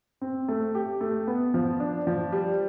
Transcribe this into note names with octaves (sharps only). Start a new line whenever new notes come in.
C4
A3
G4
A3
B3
F3
D4
F3
G3